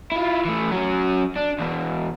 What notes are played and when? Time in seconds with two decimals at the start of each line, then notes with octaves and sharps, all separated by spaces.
0.12 E4 F4
0.45 E3 A3
0.71 F#3 C#4
1.36 D4
1.59 E2 B2